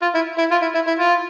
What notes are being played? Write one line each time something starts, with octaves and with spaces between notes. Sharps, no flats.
F4
E4
E4
F4
E4
E4
E4
F4